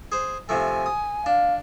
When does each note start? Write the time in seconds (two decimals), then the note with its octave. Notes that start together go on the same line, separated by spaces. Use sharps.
0.12 G#4 C5
0.49 C3 F3 A3 G#5
0.86 D#6
1.26 D4 F5